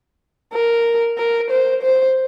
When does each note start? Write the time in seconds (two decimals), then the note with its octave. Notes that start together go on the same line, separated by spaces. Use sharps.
0.53 A#4
1.18 A#4
1.51 C5
1.83 C5